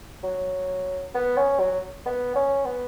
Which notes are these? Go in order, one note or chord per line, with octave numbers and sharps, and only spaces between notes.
F#3
B3
C#4
F#3
B3
C#4
B3